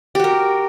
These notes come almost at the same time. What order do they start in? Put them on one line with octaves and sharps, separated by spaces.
G4 F#4 A#4